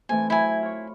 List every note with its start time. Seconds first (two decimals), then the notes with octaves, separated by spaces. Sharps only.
0.09 E3 A3 C4 G#5
0.30 F#3 E4 E5 G#5 B5
0.62 F4 C#5